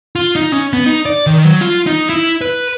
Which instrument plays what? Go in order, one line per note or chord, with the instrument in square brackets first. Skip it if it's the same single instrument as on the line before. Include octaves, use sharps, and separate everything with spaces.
[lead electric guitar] F4
D#4
C#4
B3
D#4
D5
D#3
F#3
F4
D#4
E4
B4